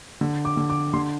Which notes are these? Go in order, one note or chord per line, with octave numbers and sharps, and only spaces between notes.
D3
D6
D3
D6
D3 C6